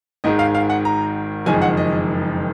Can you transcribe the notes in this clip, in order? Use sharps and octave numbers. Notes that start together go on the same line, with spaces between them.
G#1 G#2 D#3 G#3 D#5
F5
F5
F#5
A#5
F#1 F2 D#3 G#3 G#5
F#5
D#5